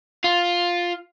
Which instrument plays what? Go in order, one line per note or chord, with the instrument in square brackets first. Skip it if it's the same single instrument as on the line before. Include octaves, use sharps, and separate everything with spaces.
[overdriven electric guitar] F4